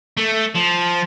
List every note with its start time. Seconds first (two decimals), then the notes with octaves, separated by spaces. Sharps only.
0.17 A3
0.55 F3